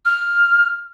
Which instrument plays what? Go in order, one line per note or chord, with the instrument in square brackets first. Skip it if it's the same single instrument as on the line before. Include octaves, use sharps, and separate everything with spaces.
[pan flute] F6